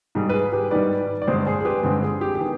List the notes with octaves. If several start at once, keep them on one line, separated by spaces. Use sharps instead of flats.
G#2 D#3 G3 G#4
B4
G#4
G4 B4
G#2 D#3 G3 B4 D5
D5
G2 D3 G#3 C4 G#4 C5
G#4 C5
G#4
G4 B4
G2 D3 G#3 C4
G#4
G4
G4
D#3 B3 G#4